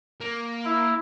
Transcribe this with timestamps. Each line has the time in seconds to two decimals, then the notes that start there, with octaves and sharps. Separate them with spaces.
0.21 A#3
0.65 E4